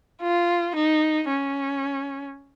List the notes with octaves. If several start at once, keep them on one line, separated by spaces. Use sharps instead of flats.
F4
D#4
C#4